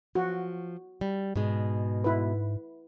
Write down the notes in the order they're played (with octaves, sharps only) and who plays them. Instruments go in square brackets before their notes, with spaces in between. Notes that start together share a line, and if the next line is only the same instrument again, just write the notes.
[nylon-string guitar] F3 [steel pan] F#4
[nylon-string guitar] G3
[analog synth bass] G#2 [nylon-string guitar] B2 G#3
[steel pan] E4 B4